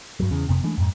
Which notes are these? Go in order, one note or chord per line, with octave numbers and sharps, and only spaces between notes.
G2 F#3
E2 C#3
F1 F2 C3 B3
E3 G#3 A3 D4
F2 G#2